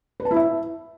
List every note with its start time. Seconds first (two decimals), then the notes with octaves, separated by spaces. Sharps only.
0.20 B4
0.25 A5
0.31 E4
0.36 E5